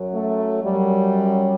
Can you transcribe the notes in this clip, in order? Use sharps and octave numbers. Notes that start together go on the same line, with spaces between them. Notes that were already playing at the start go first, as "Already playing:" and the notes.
Already playing: F#2 F#3
A3
F#2 F#3 G3